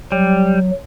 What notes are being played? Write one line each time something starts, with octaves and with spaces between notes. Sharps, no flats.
F#3 G3